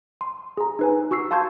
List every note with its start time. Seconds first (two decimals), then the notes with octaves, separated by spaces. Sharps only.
0.21 C6
0.57 G#4 A#5
0.79 D#4 B4 G#5
1.11 F#4 C#6 E6 C7
1.31 F5 A5 C6 C#6 G6 G#6